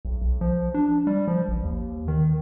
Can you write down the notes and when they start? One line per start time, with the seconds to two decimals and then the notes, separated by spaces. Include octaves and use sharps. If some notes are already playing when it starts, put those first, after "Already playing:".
0.05 B1
0.22 B1
0.41 F3
0.74 D4
1.07 G3
1.28 F3
1.48 A1
1.64 D#2
2.08 D#3